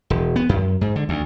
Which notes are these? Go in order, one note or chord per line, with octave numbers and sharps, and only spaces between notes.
E1
B3
F#2
G#2
D3
D2